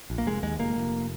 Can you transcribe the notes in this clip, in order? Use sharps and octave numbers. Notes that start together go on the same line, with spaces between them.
A#1
A#3
F1 G#3
D#2 G#3
F1 A#3
F1